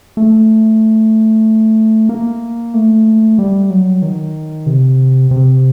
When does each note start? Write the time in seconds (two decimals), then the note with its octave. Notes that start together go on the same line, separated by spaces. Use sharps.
0.17 A3
2.09 A#3
2.74 A3
3.39 G3
3.70 F#3
4.02 D#3
4.66 C3
5.31 C3